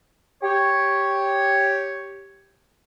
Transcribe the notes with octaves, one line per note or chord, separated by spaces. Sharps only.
G4 C#5